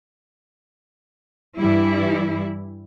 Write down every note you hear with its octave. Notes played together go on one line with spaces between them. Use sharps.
G2 E3 G3 E4